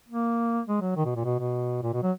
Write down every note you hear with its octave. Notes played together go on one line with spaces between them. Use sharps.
A#3
G#3
F#3
D#3
B2
A#2
B2
B2
A#2
B2
F#3